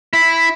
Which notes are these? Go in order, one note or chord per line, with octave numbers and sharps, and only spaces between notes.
E4